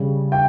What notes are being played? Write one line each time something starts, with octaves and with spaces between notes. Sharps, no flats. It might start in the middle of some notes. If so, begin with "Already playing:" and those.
Already playing: C#3 G3
G5